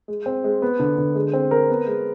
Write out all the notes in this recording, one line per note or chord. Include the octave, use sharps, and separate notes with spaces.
G#3
C4
G#3
B3
D3
D3
G#3
C4
A#4
B3
G#3